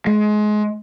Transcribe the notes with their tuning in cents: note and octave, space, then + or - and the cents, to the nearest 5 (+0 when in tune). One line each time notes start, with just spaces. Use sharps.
G#3 +25